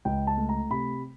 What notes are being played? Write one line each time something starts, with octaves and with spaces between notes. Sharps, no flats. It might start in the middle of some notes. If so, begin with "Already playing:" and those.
C#2 G5
A5
A3
A#5
C3 B5